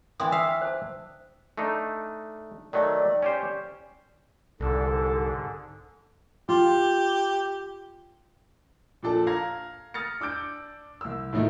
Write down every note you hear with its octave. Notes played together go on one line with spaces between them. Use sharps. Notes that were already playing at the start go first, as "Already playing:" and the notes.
E3 D4 G5 C6 D#6
E5 F5
C5 A5
A3 D4 D#4
D#3 F#3 A3 D5
C#4 G4 C5
C2 G#2 D3 A4
F4 G4
A#2 F3 D4 A4
F5 A#5 G#6 A#6
D#6 F6 A6 A#6 C#7
D4 D6 E6 G6 D7
C2 E6
A2 D#3 F3 A3 D#4 E4